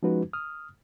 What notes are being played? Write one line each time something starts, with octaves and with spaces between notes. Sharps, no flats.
F3 G#3 C#4 D#4 F#4 B4
D#6 F6